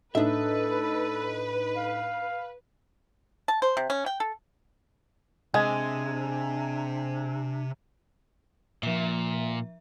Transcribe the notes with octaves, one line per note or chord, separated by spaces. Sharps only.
A2 D4 D#4 A4 B4 E5
F5
A5
C5
C3
C#4
G5
A4
C3 G#3 D4 G#5
A#2 F3 E5